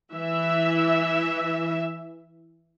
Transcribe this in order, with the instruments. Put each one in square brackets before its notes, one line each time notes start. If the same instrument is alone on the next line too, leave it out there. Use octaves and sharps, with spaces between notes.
[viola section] E3 E5